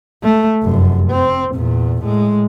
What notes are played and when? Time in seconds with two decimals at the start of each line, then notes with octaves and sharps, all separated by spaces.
0.23 A3
0.63 F1 F#2
1.10 C4
1.55 E2 A#2
2.01 A2 G#3